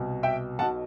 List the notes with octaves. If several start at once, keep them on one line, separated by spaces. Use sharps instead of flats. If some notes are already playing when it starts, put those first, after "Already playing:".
Already playing: C2 B2
E5 G5
B1 B2 F#5 A5